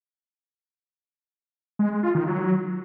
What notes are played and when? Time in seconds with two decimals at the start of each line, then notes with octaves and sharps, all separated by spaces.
1.79 G#3
1.91 G#3
2.03 F4
2.15 D#3
2.27 F#3